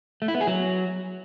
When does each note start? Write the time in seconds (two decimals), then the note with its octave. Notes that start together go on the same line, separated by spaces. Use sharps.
0.22 A3
0.28 E4
0.35 B3
0.41 G#4
0.47 F#3